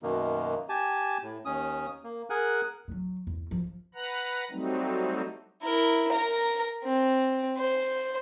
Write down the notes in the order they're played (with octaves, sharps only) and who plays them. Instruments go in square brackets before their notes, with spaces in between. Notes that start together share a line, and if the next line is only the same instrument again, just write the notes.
[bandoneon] F#2 B2 D#3 A#3
G4 G#5 A5
A2
D#2 C#4 D#6
A#3
G#4 A#4 F#5 G#5 F#6
[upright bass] F#3 G#3
E2
F3
[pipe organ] B4 F#5 A#5 F#6
F#3 G3 A3 C4 D#4
[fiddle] E4 A#4
A#4 A#5
C4
C5